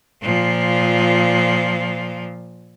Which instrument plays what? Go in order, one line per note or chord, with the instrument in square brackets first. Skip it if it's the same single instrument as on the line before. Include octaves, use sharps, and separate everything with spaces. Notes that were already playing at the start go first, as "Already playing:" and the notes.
[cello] A#2 F3